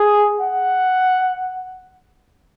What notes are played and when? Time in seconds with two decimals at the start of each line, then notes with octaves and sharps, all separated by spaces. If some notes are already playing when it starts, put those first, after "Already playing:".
Already playing: G#4
0.41 F#5